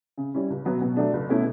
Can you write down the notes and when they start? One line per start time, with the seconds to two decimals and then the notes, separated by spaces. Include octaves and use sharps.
0.18 C#3
0.34 G3 C#4 E4
0.50 C#2
0.65 B2 F#3 B3
0.82 B2
0.97 F#3 A3 D4
1.13 C#2
1.29 B2 A3 C#4 E4